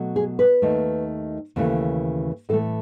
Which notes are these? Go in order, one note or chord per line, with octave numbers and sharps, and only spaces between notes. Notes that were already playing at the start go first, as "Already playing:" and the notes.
Already playing: B2 F#3 A3
G#4
B4
D#2 D#3 A3
D#2 C#3 E3 A3
A2 E3 A3 A4